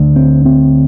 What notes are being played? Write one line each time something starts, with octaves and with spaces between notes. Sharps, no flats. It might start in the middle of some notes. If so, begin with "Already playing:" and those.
Already playing: D2 D3
C4
C4